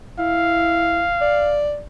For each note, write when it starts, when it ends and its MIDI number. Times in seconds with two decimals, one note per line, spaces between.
0.19 1.02 64
0.19 1.61 77
1.21 1.81 74